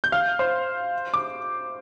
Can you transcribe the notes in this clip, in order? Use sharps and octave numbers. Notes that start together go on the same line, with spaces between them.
G6
F5 F6
C5 C6
D6